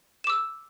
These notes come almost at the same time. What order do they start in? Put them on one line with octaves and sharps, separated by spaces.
E7 D6 E6